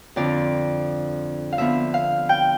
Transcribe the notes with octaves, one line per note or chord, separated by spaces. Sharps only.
F2 D3 F3 C4 D5
F5
D3 F3 B3 E5
F5
G5